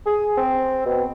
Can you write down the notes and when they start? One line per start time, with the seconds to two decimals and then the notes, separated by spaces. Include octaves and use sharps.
0.06 G#4
0.37 C4
0.86 B2